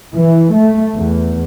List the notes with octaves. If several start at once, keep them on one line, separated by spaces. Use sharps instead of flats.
E3
A3
E2